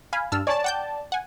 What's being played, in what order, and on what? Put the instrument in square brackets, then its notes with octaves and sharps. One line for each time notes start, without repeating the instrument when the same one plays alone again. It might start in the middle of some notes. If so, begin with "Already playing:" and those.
[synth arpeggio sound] F5 G#5 B5
[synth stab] G2 [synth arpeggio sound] A5 E6 F6
[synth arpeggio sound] C#5 G#5 [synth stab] D5 A5
[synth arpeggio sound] F#5 G5 G6
F#5 G#5